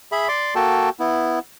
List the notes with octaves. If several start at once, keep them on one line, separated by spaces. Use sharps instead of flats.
G#4 E5 B5
D5 C6 D6
A#3 F#4 A4 G5 A5
B3 E4